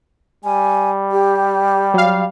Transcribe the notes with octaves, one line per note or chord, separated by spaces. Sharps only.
G3 G#5
G4
F#3 F5